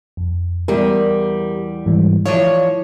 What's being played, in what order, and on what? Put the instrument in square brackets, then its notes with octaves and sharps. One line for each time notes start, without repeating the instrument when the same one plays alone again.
[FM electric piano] F2
[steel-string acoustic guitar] E2 G3 [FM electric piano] G4 A#4
[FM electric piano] G#2 E3 G3
[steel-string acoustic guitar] E3 F3 C#5 [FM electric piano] F5